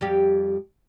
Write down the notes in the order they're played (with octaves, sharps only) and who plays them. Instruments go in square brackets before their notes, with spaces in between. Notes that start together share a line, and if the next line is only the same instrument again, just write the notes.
[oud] F2 G3 G4